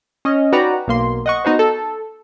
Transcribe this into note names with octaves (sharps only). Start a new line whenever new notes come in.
C#4 D#5 F6
D#4 F#4 B4 D5 G5 A#5
B1 A#3 C6
D#5 F#5 C#6
B3 D#4 F#4 C5
A4